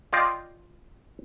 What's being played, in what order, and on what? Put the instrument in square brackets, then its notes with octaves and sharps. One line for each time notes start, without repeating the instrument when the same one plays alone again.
[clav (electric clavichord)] F4 D5 D#5 F5 G5